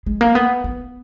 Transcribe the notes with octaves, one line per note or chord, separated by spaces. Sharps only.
G#3
A#3
B3
B3